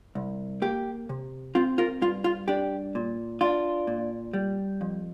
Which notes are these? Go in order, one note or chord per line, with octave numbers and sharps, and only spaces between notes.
C2
A#3 G4
C3
C4 F4
F4 A#4
G2 F4
F4
D4 G4
A#2
D4 F4
A#2
G3
F2